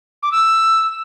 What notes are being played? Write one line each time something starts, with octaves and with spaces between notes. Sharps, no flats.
D6
E6